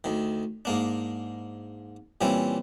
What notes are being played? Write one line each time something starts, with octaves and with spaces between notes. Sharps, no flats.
D2 D#3
G#2 A#3 D4
A#2 E3 G3 C4 C#4 E4